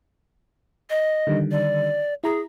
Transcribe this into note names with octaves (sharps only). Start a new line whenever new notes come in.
D#5
D3 D#3 G3
D5
E4 G#4 A#5